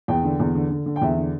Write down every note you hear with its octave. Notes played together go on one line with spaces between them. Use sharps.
E2 G5
D3
E2
D3
D3
D3
G5
E2 E5
D3